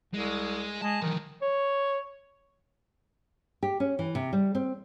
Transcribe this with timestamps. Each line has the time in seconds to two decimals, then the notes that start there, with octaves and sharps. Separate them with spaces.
0.14 C2 G#3
0.82 G#3 A5
1.02 D#3 E3 F#3
1.42 C#5
3.63 G4
3.80 C#4
3.99 E3
4.15 C3
4.33 G3
4.55 C4